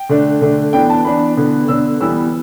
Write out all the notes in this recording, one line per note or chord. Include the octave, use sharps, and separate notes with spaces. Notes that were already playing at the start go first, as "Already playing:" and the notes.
Already playing: G5
D3 A3 D4
D3 A3 D4
E3 B3 D4 G5
A5
E3 B3 D4 B5
D3 B3 D4
D3 B3 D4 E6
E3 G3 B3 E6